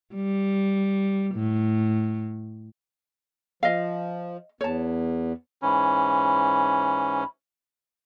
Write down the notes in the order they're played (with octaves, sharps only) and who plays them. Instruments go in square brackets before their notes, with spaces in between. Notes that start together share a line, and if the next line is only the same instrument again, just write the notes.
[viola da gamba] G3
A2
[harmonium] F3 [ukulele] D#5 F5
[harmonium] E2 [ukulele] C#5 A5
[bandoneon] G#2 E3 C#4 [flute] B5